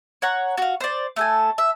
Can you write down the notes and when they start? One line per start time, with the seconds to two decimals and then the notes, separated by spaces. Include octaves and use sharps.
0.22 C#5 F#5 A#5
0.58 F#4 F5
0.81 C5 D5
1.16 A3 A4 G#5
1.58 E5